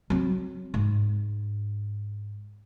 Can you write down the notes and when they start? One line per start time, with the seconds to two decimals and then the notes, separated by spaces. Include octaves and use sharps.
0.10 F#3 C4
0.74 G#2